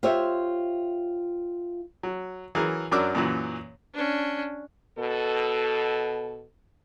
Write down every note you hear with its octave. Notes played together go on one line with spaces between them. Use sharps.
F4 G4 C5 C#5 E5
F#3
E3 F#3 G#4 A#4
F#2 F#3 D4 A#4 D6 E6
F#2 A#2 E3 F#3
C#4 D4
B2 A4